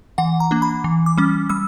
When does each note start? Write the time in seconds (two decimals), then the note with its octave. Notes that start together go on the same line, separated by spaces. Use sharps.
0.18 E3 F#5
0.40 A#5
0.51 A#3 D4
0.62 B5
0.84 E3
1.06 D6
1.18 G3 C#4
1.49 G3 E6